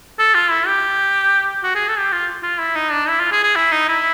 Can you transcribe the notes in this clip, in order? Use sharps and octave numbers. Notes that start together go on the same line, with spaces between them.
A4
F4
E4
G4
F#4
G#4
A4
G4
F4
F4
E4
D#4
D4
E4
F4
G#4
G#4
E4
D#4
E4